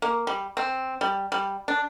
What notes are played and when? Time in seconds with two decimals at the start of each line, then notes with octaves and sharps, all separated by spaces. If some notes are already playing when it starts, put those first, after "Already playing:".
0.02 A#3
0.27 G3
0.57 C4
1.01 G3
1.32 G3
1.68 D4